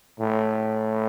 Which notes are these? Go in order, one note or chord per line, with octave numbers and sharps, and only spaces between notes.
A2